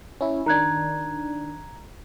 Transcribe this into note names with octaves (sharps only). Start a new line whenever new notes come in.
C#4 E4
D#3 D4 A#5 F#6 G#6